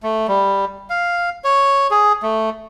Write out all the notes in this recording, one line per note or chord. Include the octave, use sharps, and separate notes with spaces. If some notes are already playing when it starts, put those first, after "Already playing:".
A3
G3
F5
C#5
G#4
A3